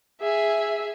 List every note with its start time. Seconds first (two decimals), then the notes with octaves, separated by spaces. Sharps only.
0.21 G#4 E5